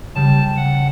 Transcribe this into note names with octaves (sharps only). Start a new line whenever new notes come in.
C#3 G3 A5
F#5